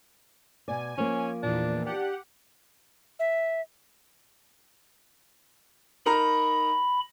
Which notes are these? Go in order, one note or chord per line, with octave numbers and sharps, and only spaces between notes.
B2 D5 G#5
F3 A#3 C#4
E2 A#2 D4
D4 G4 F#5
E5
D#4 A#4 A#5 B5